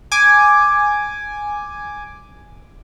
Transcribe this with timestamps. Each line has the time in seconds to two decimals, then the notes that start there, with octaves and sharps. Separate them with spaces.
0.12 G#5 D6